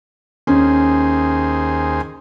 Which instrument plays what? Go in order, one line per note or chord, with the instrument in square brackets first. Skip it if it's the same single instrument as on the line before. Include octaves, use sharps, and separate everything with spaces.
[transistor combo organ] D#2 G#4 C5 [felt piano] C#4